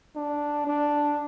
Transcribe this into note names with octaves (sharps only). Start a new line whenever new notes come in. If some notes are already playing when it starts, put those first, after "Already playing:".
D4
D4